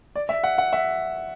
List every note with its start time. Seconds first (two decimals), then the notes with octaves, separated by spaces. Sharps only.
0.16 D5
0.29 E5
0.43 F#5
0.58 F#5
0.73 E5